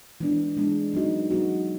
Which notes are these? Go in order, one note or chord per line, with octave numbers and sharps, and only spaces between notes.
E3 G#3 B3 D4
E3 G#3 B3 D4
F#3 B3 D#4 F#4
F#3 B3 D#4 F#4